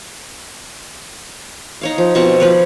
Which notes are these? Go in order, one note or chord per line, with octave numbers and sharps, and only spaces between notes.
D#4 C#5 F5
F3
B2 F3 C4 C#6
F3 B4 C#5